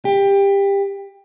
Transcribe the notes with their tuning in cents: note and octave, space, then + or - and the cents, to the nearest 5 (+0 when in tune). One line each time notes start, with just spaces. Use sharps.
G4 +20